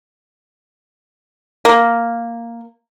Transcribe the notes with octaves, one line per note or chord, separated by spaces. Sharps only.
A#3